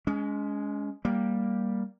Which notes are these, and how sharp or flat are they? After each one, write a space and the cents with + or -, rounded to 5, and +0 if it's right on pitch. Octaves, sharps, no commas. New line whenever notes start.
G#3 +0 C#4 +35
G3 +0 A#3 +0